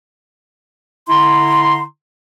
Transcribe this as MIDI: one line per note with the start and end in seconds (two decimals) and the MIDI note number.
1.09 1.83 50
1.09 1.83 64
1.09 1.83 82
1.09 1.83 84